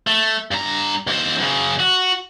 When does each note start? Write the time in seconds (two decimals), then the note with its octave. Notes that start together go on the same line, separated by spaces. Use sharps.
0.07 A3
0.51 G2 A#5
1.07 D#2 C5
1.38 F#2 C#3
1.80 F#4